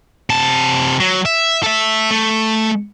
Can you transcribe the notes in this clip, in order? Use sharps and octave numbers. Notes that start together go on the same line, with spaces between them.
C3 A5
F#3
E5
A4 E5
A3